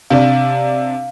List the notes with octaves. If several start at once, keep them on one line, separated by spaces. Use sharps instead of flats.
C3 D4 F5